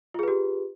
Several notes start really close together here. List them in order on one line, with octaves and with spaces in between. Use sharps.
F4 G#4 B4 G4